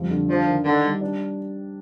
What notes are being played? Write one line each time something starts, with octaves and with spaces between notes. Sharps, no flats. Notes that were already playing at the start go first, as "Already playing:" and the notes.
Already playing: F2 G3
D3
F3 D4
D#3
D3 D#4
G3
D4